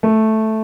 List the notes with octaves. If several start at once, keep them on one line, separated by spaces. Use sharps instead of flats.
A3